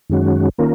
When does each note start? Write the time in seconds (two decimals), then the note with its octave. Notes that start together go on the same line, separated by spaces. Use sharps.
0.10 F#2 D#3 G#3 C#4 F#4
0.58 D#3 A#3 C#4 F4 A#4